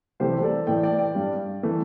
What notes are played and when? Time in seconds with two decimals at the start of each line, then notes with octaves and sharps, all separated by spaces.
0.20 C2 C3 E3 A3 G4 C5
0.43 A4 D5
0.67 A2 E3 A3 D5 G5
0.83 D5 G5
0.99 D5 G5
1.15 G2 G3
1.63 E3 A3